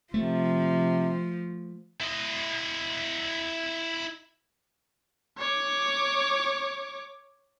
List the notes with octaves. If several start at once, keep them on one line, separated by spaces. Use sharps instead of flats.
C3 F3 A3
E4 D#5
C#5 D6